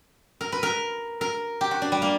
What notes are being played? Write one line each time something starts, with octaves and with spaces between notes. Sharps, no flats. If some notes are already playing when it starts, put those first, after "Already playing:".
A#4
B4
A#4
A#4
G4
F#4
D4
G3
A#3